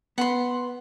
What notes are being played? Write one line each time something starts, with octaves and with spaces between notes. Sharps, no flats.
B3 F#5 B5 C6